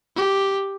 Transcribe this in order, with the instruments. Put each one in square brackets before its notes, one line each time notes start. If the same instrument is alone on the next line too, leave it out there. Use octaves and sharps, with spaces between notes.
[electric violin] G4